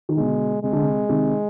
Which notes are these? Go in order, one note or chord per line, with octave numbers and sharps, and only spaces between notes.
D#3
B2 D3 G#3
C3 G#3
D3
C3
C3 D#3